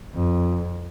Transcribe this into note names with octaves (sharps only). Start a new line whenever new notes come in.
F2